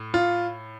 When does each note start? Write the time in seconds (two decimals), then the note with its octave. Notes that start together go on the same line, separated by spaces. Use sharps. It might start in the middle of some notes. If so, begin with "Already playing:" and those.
Already playing: A2
0.14 F4